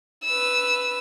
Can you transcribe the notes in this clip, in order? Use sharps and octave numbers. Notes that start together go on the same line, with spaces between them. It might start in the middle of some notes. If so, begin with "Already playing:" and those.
B4 E6